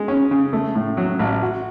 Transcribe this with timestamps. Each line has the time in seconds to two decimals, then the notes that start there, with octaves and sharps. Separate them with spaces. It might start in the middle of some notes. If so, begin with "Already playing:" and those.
Already playing: G#3
0.08 C#4
0.31 C#3
0.53 A3
0.75 A2
0.97 F#3
1.19 A1
1.42 F#4